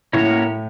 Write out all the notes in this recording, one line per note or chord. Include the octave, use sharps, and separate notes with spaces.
A2 A#3 C#4 F#4 A#4 C#5